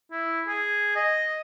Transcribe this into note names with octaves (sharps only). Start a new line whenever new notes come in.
E4
G#4
D#5